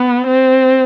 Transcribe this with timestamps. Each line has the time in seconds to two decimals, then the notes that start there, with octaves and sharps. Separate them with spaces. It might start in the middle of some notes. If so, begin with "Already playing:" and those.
Already playing: B3
0.27 C4